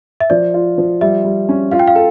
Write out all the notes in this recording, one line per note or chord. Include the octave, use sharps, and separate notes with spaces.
E5
F3 D5
F4
F3
G3 E5
G3
C#4
F4 F5
G5
F5
A4